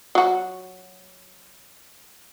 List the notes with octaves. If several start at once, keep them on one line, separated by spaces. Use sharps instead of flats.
F#3 F#4